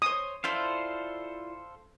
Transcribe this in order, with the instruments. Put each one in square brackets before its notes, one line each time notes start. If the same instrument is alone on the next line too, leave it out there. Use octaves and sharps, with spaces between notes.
[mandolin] C5 C#5 [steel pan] D#6
[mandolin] E4 F4 D5 [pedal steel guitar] A4 C5 F5